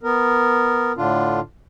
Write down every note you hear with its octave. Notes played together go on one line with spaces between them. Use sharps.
B3 A#4
A2 D3 D4 F4